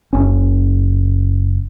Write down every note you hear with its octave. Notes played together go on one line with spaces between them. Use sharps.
F#1 C#4